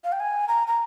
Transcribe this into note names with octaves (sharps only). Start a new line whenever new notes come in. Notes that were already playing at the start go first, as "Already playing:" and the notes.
F5
G5
G#5
A#5
A#5